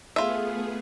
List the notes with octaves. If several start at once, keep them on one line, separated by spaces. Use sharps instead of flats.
A3 B3 F4 G#4 E5